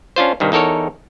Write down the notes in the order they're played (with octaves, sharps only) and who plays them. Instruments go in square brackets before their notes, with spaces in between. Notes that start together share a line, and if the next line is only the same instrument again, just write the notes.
[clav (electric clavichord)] C#4 D4 F4 C5
C2 G2 D#3
E2 D#4 A4 A#4 C#5